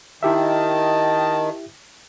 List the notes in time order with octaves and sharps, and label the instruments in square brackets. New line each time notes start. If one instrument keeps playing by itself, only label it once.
[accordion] D#3 [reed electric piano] E4 G4 E5 [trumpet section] D#5 G5 A5